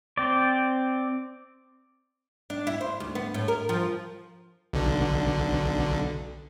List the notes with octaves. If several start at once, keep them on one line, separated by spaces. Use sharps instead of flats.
C4 D5
D4
E4
C5
D2
B3
A2
A#4
F3
B1 D3